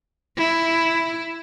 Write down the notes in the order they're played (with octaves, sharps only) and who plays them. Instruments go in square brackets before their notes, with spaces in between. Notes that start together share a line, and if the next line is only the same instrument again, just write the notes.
[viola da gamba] E4